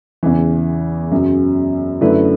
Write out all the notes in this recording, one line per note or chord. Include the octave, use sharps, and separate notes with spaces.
E2 C#3 E3
F#2 C#3 F#3
F#2 D3 A3 E4 B4